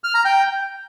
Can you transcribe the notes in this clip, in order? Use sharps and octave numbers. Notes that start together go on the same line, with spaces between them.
F6
A#5
G5